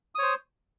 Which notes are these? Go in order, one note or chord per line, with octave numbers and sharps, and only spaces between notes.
C5 C#5 D#6